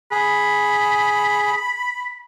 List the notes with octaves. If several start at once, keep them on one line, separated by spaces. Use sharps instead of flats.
G#4 B5